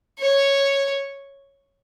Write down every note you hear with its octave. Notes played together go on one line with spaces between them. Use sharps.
C#5